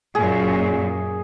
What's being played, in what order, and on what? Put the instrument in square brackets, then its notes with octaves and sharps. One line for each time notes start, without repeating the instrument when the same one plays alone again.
[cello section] F#2 A#2 [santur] G#4